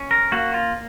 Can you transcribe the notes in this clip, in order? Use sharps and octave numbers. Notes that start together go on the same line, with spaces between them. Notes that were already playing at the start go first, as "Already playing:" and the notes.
Already playing: C#4
A#4
A#3 F#4
F4